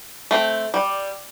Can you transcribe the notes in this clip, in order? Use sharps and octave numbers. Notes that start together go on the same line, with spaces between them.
A3 C4
G3